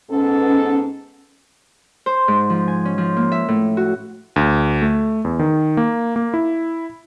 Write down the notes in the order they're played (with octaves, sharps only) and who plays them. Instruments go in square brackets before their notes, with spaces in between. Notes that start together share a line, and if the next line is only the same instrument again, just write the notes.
[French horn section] G#2 B3 A4 [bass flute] C#4
[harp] C5
G#2
F3
G#5
C#4
F3
A#3
E5
A2
F#4
[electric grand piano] D2
A3
E2
D#3
A#3
A#3
E4